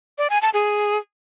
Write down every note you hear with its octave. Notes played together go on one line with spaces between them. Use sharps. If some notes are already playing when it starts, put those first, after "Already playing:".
D5
G#5
A5
G#4